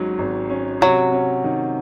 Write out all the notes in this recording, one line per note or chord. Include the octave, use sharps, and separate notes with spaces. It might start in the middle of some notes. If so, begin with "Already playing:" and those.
Already playing: G#1 G#2 F#3 C#4
G#1
C#4
C3 F#3
C#4
D#3